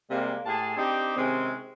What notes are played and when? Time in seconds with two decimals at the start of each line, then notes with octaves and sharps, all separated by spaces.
0.11 C3 G3 G#3 A#3
0.46 A2 G4 G#4 A5
0.76 C4 D4 D#4 G4
1.17 C3 D#3 G#3 C4 C#4